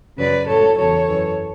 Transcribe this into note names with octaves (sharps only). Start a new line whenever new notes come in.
F#2 C#3 F#3 B4 D5
A2 F#3 A4 C#5
E2 C#3 F#3 A4 C#5
F#2 E3